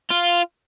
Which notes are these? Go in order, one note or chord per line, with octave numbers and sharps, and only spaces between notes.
F4